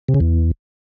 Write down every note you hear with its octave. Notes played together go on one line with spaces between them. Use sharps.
C3
C#3
E2